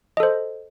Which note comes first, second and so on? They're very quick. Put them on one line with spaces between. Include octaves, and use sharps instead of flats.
D#5 A4 C5